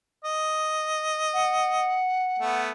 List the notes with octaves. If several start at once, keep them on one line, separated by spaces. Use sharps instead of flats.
D#5
F#5
A3 B3